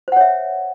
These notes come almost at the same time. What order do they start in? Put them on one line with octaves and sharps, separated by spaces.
C5 F#5 C#5 E5